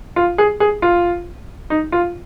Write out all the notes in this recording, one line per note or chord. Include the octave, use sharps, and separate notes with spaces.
F4
G#4
G#4
F4
D#4
F4